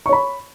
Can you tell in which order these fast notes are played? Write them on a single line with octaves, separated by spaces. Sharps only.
C#6 C#5 B5